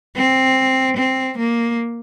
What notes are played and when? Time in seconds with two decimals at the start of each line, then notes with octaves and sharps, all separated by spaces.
0.16 C4
0.97 C4
1.38 A#3